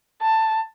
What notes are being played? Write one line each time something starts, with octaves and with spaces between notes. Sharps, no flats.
A5